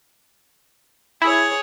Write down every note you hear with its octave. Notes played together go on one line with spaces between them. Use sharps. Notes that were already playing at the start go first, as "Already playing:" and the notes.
E4 G#4 C#5